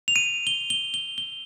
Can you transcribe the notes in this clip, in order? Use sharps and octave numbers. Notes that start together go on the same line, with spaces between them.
F7
D#7
G7
G7
G7
G7